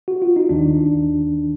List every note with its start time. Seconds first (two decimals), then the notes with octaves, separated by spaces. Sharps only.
0.08 F#4
0.22 F4
0.36 D#4
0.49 D#2 D#3 D4